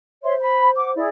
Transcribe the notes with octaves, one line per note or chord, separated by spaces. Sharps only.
C5 C#5 E5 C6
B5
F#5 D6
E4 G#4 D5